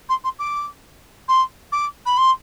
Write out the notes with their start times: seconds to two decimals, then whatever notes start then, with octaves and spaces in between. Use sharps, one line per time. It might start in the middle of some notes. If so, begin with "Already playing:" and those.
0.09 C6
0.24 C6
0.39 D6
1.28 C6
1.72 D6
2.06 B5
2.17 C6